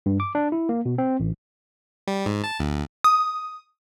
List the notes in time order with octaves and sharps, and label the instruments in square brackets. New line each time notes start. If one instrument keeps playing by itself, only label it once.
[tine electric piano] G2
D6
D4
E4
A#3
B2
C4
A1
[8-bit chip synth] G3
G#2
A5
D2
[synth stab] D#6